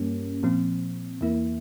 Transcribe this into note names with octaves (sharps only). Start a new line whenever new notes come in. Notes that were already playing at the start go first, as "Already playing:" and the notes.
Already playing: G2 G3 A#3 C#4
A#2 F3 C4
E2 E3 A#3 E4